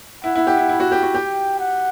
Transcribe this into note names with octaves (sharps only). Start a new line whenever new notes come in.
E4 F#5
E4
G4
E4
E4
F#4
G4
F#4
G4 G5
F#5